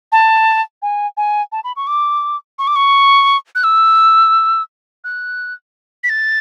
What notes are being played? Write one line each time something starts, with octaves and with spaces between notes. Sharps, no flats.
A5
G#5
G#5
A5
B5
C#6
D6
C#6
D6
C#6
F#6
E6
F#6
B6
A6